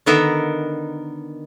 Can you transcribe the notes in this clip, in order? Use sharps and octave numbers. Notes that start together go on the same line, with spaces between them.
D3 D#3 B3 A#4 E5